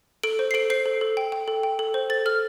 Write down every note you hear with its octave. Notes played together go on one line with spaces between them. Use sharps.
A4 D7
C5
C7
A4 D7
C5 C7
A4
A4
G5
G5
A4
G5
A4
C5
A4 A6
A4 F6